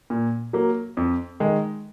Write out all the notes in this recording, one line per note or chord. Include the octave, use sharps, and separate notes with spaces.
A#2
F#3 A#3
F2
D#3 G#3